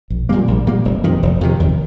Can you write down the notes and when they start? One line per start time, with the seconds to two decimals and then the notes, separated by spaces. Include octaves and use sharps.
0.10 A#1
0.29 A#2 G3 A#3
0.48 A#1
0.67 A#2 G3 A#3
0.85 F1
1.04 F2 C3 D#3
1.23 F1
1.41 F2 C3 D#3
1.60 D#2